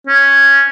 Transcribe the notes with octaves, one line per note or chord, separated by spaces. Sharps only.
C#4